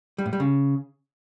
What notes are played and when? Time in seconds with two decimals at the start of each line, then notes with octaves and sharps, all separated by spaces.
0.18 G3
0.26 A2
0.33 G3
0.40 C#3